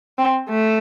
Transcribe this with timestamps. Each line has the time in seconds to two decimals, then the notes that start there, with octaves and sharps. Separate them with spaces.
0.18 C4
0.49 A3